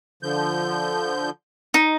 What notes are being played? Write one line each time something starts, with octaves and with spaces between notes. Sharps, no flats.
D3 F3 G6
D#4